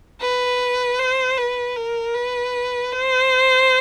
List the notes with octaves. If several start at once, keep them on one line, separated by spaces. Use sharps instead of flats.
B4
C5
B4
A#4
B4
C5